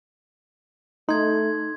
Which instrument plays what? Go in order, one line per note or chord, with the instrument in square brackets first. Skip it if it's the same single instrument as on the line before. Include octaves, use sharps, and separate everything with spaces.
[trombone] A3 [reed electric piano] D#4 [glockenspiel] C6 G#6